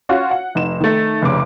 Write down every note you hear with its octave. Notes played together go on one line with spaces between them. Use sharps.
C#4 F4 F#4
F#5
F1 D#4 E7
D#3 A3
F1 C2 C#3 D6